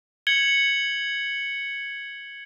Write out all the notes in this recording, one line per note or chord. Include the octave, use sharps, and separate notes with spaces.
G#6 C#7 F#7 G7